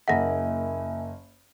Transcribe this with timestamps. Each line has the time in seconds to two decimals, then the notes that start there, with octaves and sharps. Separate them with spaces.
0.08 F#1 A#3 D#5 E5 F#5 G#5 A#6